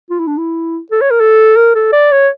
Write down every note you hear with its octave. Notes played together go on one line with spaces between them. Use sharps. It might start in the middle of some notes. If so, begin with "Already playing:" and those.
F4
E4
D4
E4
A4
C#5
A#4
A4
A#4
A4
D5
C#5